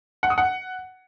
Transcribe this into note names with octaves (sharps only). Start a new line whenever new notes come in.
F#5
D#6
F#5